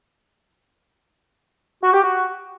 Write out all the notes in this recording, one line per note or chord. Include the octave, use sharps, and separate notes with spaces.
F#4
G4
F#4